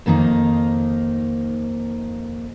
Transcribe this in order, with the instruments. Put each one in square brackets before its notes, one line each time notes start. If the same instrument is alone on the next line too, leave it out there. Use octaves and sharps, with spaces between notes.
[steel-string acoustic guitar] F2 D#3 A#3 C4 D#4